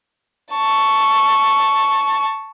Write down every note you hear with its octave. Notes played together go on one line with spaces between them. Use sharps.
A5 C#6